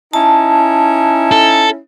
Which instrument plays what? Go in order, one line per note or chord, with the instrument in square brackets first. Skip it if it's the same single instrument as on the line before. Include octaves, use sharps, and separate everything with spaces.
[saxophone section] C#4 D#4 E4 [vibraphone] A5
[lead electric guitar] A4